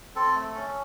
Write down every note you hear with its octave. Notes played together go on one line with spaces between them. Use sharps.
C4 A4
A3
C#4